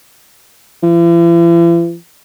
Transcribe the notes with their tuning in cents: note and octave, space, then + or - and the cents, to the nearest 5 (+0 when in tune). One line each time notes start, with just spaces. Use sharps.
E3 +45